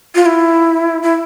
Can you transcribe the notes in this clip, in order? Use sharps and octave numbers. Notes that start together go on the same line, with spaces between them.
F4
E4
E4